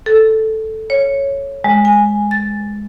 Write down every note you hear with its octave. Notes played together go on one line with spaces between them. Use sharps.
A4
C#5
G#3
G#5
A6